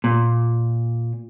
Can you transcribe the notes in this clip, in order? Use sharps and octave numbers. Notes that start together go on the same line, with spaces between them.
A#2